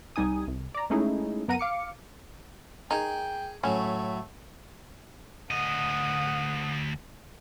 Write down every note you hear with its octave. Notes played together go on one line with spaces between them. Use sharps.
C2 G3 D#4 G#5 D#6
C2
D5 A#5
G#3 A3 C#4 D#4 E4 G#4
F#2 B3 A#4 F#5 A#5 D#7
F5 D6 C#7
D#3 D#4 G#4 G5
A2 F#3 A3 C#4
D2 D#5 F#5 D#6